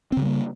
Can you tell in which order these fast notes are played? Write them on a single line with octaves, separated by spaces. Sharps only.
C4 C#3 G3 A#3